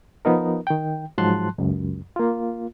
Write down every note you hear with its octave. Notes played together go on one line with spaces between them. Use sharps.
F3 B3 D#4 A#4
D#3 G5
G#2 F3 F#3 A5 C6 F#6
C#2 F#2
A#3 F4